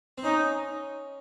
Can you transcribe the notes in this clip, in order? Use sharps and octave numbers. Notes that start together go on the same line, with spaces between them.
C4
C#4 D#4